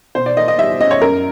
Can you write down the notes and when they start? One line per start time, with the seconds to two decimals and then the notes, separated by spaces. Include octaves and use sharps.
0.15 B2 C5
0.26 D5
0.37 A#3 D#5
0.48 D#5
0.58 G3 E5
0.80 C#4 D#5
0.91 C#5
1.02 F#2 A#4